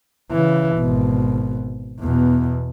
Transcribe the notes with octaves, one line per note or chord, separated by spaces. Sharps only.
C#3 E3
G#1 B2
E2 B2